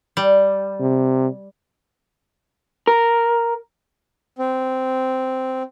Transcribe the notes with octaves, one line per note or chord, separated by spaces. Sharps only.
G3
C3
A#4
C4